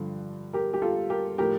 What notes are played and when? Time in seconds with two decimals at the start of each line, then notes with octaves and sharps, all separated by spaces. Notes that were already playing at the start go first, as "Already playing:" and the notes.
Already playing: G2 D3 F3
0.53 G4 A#4
0.74 G4
0.82 F4 A4
1.10 G4 A#4
1.38 A2 F3 G4 A#4